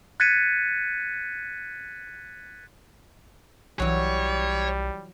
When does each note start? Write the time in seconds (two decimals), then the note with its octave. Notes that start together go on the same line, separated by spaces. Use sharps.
0.20 F#6 G#6 A6 B6 C#7 D#7
3.80 B1 E3 F#3 G3 C#5